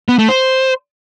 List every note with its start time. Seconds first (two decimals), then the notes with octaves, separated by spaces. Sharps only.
0.09 B3
0.19 A3
0.29 C5